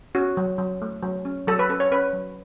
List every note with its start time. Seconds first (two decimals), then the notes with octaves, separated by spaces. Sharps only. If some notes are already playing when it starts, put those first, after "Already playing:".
0.15 C#4 F#4
0.37 F#3
0.58 F#3
0.82 A3
1.03 F#3
1.25 C#4
1.47 F#3 A4
1.59 B4
1.69 C#4 A4
1.80 C#5
1.92 C#4 B4
2.13 F#3